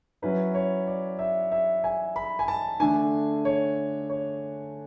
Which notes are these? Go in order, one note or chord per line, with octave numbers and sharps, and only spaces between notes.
F#3 C#4 E4 B4
C#5
D5
E5
E5
G#5
B5
G#5
A5
D3 A3 D4 G#5
C#5
C#5